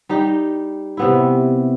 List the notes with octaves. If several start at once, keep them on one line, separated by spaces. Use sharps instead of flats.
G3 D#4 G4
C3 E3 B3 E4